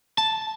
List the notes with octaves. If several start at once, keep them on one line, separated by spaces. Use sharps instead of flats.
A5